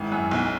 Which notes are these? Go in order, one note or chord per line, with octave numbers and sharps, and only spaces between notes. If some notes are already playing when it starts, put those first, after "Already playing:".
Already playing: G#1 E4
F#2
B1